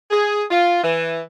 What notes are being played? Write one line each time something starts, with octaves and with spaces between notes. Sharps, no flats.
G#4
F4
E3